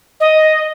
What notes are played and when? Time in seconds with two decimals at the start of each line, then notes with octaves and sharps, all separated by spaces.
0.20 D#5